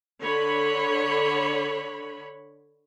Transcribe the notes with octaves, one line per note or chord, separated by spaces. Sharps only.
D3 C#5 B5